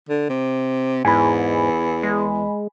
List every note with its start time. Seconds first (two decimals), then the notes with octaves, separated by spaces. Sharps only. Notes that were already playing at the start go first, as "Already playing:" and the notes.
0.09 D3
0.29 C3
1.05 E2 G#2 G#5 B5
2.03 G#3